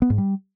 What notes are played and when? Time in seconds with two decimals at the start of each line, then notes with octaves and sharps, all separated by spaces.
0.02 B3
0.10 G#2
0.18 G3